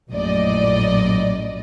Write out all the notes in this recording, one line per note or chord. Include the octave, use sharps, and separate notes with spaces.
A#1 F#2 A2 D5 D#5